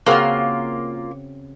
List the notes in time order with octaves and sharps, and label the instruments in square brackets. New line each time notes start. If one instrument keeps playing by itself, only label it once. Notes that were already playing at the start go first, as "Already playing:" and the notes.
[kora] C#3 C4 F#4 [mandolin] A#3 F4